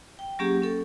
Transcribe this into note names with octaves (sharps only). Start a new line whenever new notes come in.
G5
F#3 A#3 C#4 G4 G#4
C#4 A4